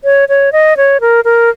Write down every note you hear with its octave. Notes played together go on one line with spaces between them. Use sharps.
C#5
C#5
D#5
C#5
A#4
A#4